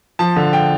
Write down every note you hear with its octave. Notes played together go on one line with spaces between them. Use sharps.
F3 A5
D3
G5